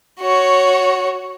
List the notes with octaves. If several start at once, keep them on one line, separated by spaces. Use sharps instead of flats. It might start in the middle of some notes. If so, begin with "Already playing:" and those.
F#4 C#5